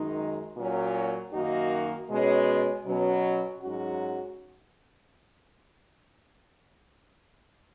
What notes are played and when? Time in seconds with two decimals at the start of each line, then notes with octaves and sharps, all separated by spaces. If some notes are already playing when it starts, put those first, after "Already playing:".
Already playing: F#2 D#3 G#3 D#4
0.56 A#2 F#3 C#4 F#4
1.32 F#2 D#3 A#3 D#4 F#4
2.09 B2 G#3 C#4
2.85 B2 F#3 C#4
3.61 G#2 F#3 C#4 F#4